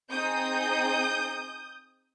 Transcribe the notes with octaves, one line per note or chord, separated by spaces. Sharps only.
C4 D#4 G#4 D#6 G6